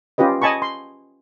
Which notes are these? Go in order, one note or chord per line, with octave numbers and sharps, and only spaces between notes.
C#4 F4 G4 B4 D#5
D#5 G#5 A5 B5 C#6
C6